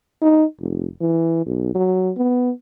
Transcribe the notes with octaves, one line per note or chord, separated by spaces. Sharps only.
D#4
F1
E3
B1
F#3
B3